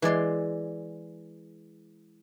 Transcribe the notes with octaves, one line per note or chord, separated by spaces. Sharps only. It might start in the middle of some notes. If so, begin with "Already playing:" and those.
E3 G#3 D5 C6